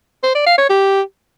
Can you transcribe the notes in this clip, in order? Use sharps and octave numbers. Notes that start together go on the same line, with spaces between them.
C5
D5
F5
C#5
G4